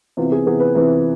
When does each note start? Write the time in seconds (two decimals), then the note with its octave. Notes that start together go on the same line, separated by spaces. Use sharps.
0.17 C3 E3 B3 F4
0.32 G#4
0.46 C3 E3 B3 G#4
0.60 B4
0.74 C3 E3 B3 B4